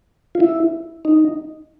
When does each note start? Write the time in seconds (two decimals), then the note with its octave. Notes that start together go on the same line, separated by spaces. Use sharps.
0.35 F4
0.40 E4
1.05 D#4